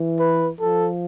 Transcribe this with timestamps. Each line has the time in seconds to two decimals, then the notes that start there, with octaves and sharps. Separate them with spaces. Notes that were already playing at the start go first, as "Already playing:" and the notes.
Already playing: E3
0.20 B4
0.60 F3 A4